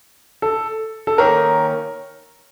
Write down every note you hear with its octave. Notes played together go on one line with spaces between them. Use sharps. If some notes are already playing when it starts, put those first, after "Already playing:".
A4
A4
D#3 A#3 C#4 A#4